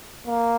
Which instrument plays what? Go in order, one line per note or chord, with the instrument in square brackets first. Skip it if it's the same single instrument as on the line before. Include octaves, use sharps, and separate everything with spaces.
[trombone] A#3